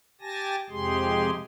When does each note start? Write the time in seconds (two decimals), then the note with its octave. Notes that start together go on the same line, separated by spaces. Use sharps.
0.21 G4 G#5 A5 A#6
0.70 F2 C3 G#3 G4 G#4 C6